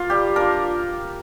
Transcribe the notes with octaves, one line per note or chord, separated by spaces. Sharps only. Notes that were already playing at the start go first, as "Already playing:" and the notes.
Already playing: A#3 F4
G3 G4
D4 F4 A#4